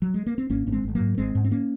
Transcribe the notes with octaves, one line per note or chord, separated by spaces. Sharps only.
F#3
G#3
A#3
C4
G#1 A#3 C#4
G#1 C#4
G#3 C4
G#1
G#3
F#3 A#3
G#2
G#1 G#3 C4
G#2
C4
A#3 C#4